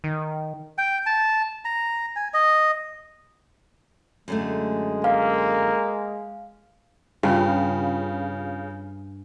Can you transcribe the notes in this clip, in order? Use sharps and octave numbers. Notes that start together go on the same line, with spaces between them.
D#3
G5
A5
A#5
G#5
D#5
F#2 D3 G#3 A3
A#3 F5
G2 C#3 F4